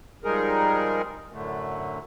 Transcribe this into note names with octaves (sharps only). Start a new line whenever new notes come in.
F3 G3 G#3 D#4 G#4 A#4
F#2 A2 D3 A3